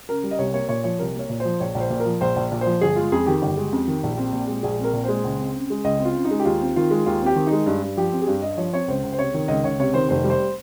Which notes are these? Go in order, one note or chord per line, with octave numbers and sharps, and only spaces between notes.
C#3 A#4
G3
D#5
C2 C#5
A#3 C#5
A#2 C#5
F3 C#5
C2 A#4
A#3 C#5
A#2
C5
F3
A#1 C#5
A#1
C5
A#2
A#4
F3
A#1 C5
A#1
A#2
C5
F3
G1 G#4
G#3 F4
F2 G#4
D#3 G4
G1
G#3
F2
D#3
A#1
C4
A#2
G#3
A#1 G#4
C4 A#4
A#2
G#3 C5
C#2
C4
C#3
G#3
C#2 D#5
C4
F4
C#3
D#4
G#3
G4
D#2 F4
C4
D#3 F4
G#3
D#2 F4
C4 G4
D#3
D#4
G#3
G2
G2
F3 G4
C4
G#4
G2 G4
G2 D#5
F3 C#5
C4 C#5
C#2 C5
C#2
C5
C3 C#5
D#3
C#2 D#5
C#2 C#5
C3 C#5
D#3 C5
F1 C5
G3
C5